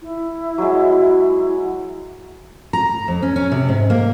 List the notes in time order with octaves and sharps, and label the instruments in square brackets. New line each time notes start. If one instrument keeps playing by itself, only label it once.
[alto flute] E4
[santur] F#3 G#3
[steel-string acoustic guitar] A#5
F2
C#4
C#4
C3
G#2
A#3